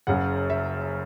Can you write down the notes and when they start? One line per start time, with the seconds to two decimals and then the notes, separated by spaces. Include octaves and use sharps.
0.07 F#1 F#2 C#3 F#5
0.50 E5